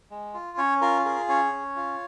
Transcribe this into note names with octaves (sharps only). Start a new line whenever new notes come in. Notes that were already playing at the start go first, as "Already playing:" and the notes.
G#3
F4
C#4 C#5
F4 A#4
G#4 A#4
C#4 C#5
C#4
F4